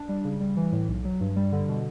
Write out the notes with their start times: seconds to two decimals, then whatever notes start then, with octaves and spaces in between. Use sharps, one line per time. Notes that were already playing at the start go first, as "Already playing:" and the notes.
Already playing: D4
0.09 G3
0.25 C#3
0.40 G3
0.57 E3
0.72 A2
0.88 B1
1.05 F#3
1.21 G2
1.36 G3
1.52 D3
1.69 B2